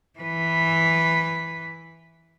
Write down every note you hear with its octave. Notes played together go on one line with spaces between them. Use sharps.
E3 B4